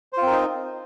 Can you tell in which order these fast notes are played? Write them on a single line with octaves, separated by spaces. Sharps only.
C5 F4 C4 A#4 D#4